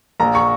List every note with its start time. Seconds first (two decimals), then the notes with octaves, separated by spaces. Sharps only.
0.20 A#1 A#5
0.35 C#6